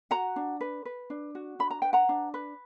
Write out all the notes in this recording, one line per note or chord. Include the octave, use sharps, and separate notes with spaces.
F#4 F#5 A#5
D4
B4
B4
D4
F#4
D4 B5
A#5
B4 G5
F#5 A#5
D4
B4